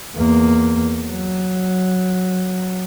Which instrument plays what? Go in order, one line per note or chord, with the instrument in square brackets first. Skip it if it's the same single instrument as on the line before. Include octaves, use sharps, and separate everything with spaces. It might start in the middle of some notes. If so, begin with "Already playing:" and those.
[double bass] E2 A#3
F#3